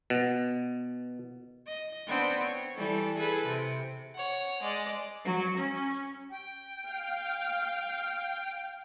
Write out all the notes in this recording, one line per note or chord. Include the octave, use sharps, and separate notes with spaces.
B2
D#5
B3 C4 D4
C#5
E3 G3 A4
G#4 A4 B4
C3
C#5 F#5
G#3 D5
F#3
C#4
G5
F5